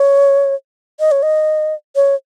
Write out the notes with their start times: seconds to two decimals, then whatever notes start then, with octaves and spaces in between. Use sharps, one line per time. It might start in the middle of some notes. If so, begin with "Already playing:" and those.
Already playing: C#5
1.00 D#5
1.11 C#5
1.23 D#5
1.96 C#5